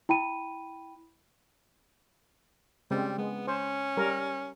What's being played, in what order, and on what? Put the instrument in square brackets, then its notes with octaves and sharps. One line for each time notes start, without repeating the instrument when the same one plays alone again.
[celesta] E4 G5 B5 D#7
[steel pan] C#3 G#3 C4 [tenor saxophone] G3
[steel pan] G#3 [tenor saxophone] B3
[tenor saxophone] C#4 [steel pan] C5
[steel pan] G3 A#4